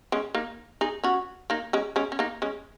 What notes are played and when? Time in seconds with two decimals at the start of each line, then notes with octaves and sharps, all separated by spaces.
0.12 G#3 C#4
0.35 A#3 D#4
0.81 D#4 G#4
1.04 C#4 F#4
1.50 A#3 D#4
1.73 G#3 C#4
1.96 G#3 C#4
2.12 C#4
2.19 A#3 D#4
2.42 G#3 C#4